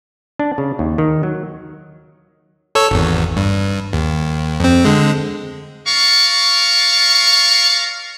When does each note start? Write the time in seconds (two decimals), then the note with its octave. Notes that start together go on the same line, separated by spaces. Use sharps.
0.39 D4
0.58 C#3
0.79 D#2
0.98 D#3
1.23 F#3
2.75 A4 C#5 E6
2.91 G#1 E2
3.37 G2
3.93 D#2
4.60 F2 C4
4.85 D3 G#3
5.87 A#4 D5 F5 C#6